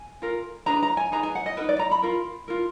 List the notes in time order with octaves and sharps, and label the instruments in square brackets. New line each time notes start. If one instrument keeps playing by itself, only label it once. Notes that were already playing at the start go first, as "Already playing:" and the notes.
Already playing: [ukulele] G#5
F4 A#4
D4 G#4 B4 A#5
A#5
G#5
D#4 G#4 B4 A#5
G#5
F#5
D#5
A#4 B4
D#4
D5
A#5
B5
F4 A#4
F4 A#4